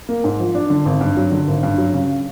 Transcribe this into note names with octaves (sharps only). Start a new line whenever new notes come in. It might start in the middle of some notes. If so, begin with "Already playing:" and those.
A#3
G#2
F3
D4
D3
G#1
G2
F#3
D3
G#1
G2
F#3
C#3